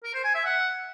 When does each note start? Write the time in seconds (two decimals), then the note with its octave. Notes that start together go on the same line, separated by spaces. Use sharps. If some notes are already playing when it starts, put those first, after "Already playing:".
0.04 A#4
0.14 C5
0.24 G#5
0.35 E5
0.45 F#5